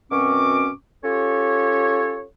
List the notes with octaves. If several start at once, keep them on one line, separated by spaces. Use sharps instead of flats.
F#2 B2 C4 C#4 C#6 D6
C#4 F4 G4 A4 C#5